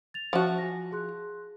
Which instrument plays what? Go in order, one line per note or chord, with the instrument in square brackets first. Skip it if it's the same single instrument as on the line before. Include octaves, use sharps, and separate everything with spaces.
[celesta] A6 F7
[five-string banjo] F3 F#4 [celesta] C5 E5 A5
[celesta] G#5 A#6
G#4 C6 F#6